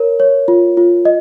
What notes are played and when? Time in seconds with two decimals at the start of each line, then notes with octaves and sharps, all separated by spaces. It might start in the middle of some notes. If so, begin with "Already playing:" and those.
Already playing: A#4 C#5
0.20 C#5
0.48 F4
0.77 F4
1.05 D#5